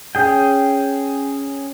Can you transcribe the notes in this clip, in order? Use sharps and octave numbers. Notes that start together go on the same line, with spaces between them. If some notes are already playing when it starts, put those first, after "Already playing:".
C#4 G#4 G5